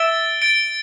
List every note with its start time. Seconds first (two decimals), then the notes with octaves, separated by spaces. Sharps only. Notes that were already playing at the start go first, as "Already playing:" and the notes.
Already playing: E5 A6 D7 G7
0.41 A6 D7 G7